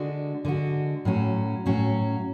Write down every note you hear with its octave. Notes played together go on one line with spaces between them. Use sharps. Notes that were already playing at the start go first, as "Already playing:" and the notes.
Already playing: D3 G#3 D4 F#4
D3 G#3 D4 F#4
A2 F#3 C#4 F#4
A2 F#3 C#4 F#4